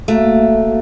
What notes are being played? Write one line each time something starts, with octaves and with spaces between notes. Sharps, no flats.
A3 A#3 F#4 F5